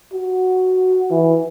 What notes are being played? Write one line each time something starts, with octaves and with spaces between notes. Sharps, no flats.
F#4
E3